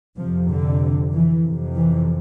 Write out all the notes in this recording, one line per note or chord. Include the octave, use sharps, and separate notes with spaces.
F2 C3 F3
D3
E3
F2 C3
E3